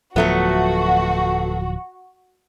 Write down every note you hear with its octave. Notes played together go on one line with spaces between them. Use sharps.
D1 F3 F#3 A3 B3 F#4